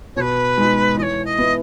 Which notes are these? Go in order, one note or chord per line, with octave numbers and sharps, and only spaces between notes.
B2 B4 C#5
G#3 D#4
E3 C#5 D#5
D#5
B3 E4